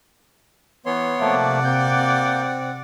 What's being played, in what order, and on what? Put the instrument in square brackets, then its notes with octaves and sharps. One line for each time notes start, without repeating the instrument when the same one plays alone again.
[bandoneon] E3 [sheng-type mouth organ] B3 C#5 C6
[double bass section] C3 [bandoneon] F3 A3 A#3 [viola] D5 F#5
[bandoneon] A#3 G6 [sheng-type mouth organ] C4